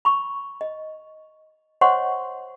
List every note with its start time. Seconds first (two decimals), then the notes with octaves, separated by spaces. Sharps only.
0.05 B5 C#6
0.61 D#5
1.81 C5 C#5 D#5 F#5 C6 C#6